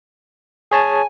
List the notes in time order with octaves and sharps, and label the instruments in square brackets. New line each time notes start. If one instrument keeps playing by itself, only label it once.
[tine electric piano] G#4 C#5 A5 [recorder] G#5